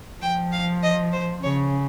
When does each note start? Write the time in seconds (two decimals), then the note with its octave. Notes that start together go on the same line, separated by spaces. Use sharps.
0.22 F3 G5
0.52 F5
0.83 D#5
1.13 C5
1.43 C#3 C#5